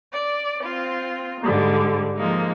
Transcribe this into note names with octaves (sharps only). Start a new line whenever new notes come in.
D5
C4 F4
G#2 D3 G3
F3 G#3 A#3 D#4